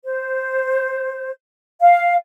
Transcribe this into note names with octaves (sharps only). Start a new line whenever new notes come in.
C5
F5